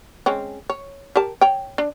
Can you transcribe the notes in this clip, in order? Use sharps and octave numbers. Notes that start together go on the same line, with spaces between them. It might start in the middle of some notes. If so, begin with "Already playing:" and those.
G#3 C4 C#4
C#5
G4 A#4 A5
C#5 G5
D4